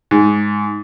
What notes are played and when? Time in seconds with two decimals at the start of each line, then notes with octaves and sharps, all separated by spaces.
0.11 G#2